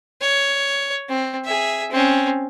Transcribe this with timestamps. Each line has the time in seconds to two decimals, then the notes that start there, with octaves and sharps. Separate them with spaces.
0.21 C#5
1.09 C4
1.45 G#4 E5
1.91 C4 C#4